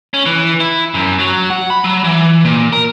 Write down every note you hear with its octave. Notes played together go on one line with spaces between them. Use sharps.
C#4
E3
E4
F#2
F#3
F#5
B5
F#3
E3
A#2
A#4